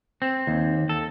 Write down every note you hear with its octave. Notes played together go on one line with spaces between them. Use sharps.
C4
D#2
A4